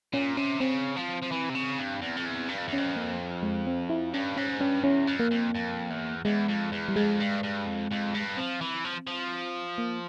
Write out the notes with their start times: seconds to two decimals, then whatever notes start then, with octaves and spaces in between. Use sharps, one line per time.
0.14 A#2 C#4
0.37 C3 C#4
0.60 C#3 C4
0.96 F3
1.22 F3
1.31 E3
1.49 C3
1.55 C#3
1.78 G2
2.02 E2
2.16 F2
2.25 E2
2.49 G2
2.58 F2
2.68 E2
2.73 F2 C#4
2.96 A#3
3.43 G#3
3.67 C4
3.90 E4
4.13 G2 C#4
4.37 G#2 C#4
4.61 G2 C#4
4.84 E2 C#4
5.08 F2
5.20 A#3
5.31 F2
5.55 F2
5.90 E2
6.25 E2 G#3
6.49 F2
6.72 E2
6.88 G3
6.96 F2 G#3
7.20 G2
7.43 G2
7.66 F2
7.91 F2
8.14 G2
8.37 F3 C4
8.61 E3
8.85 F3
9.07 F3
9.78 A#3